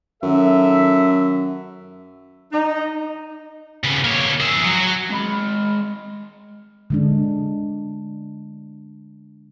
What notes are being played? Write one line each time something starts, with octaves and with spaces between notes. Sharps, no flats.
F#2 D#3 A4 E5
D#4
C#3 B3
A#3 C#5
G#4 E5
F#3 F#4
G#3 B5
D3 G#3 D4